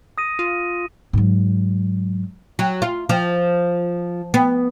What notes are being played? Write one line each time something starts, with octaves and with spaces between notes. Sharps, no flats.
D#6 A#6 D#7
F4 D#7
G#2 F#3
F#3
F4
F3
B3